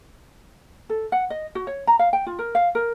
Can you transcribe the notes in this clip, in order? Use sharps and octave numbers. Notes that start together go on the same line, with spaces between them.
A4
F#5
D#5
F#4
C#5
A#5
F5
G5
F4
A#4
F5
A#4